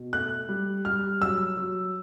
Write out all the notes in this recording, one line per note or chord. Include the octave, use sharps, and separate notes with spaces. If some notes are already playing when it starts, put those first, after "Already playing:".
Already playing: B2
A3 F#6
G3
G3 F6
F#3 E6
F#3